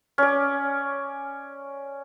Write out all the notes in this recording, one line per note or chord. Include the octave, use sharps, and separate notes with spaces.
C#4 D5